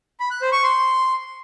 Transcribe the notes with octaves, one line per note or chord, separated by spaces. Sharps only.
B5
F#6
C5
C#6
C6